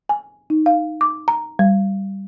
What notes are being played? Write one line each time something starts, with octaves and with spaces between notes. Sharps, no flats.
G#5
D#4
F5
D6
A#5
G3